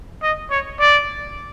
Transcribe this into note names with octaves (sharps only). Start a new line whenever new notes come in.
D#5
C#5
D5